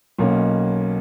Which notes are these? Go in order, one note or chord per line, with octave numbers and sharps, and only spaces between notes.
B1 B2 A#3 C#4